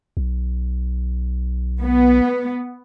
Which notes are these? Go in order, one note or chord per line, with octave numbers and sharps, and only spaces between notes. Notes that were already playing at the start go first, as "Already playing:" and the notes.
B1
B3